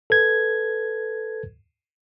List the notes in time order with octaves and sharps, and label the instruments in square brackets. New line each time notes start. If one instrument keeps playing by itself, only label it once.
[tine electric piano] A4 B4 G#6